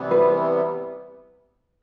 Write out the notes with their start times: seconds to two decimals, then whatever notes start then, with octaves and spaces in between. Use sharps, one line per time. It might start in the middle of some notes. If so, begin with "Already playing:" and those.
Already playing: C3 E3 G3 B3
0.11 B4